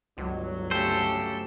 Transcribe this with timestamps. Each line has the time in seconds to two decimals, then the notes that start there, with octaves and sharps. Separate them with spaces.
0.18 G1 C#2 F#3
0.71 C#3 A3 G4 A4 C5